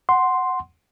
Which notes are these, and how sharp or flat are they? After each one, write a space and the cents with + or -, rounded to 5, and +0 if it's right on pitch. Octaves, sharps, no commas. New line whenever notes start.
F#5 +0 C6 +0